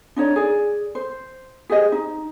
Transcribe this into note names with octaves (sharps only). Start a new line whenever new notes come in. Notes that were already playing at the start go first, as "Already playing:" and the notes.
D4 D#4 C#5 D5
G#4 D5
C5
G4 G#4 C5 D#5
D#4